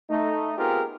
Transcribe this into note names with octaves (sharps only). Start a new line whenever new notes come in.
A3 D#4
B3 C4 F4 G4 G#4 A#4